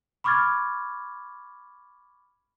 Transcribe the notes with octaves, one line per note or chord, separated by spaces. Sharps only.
B5 C#6 D6 F6 G#6 A6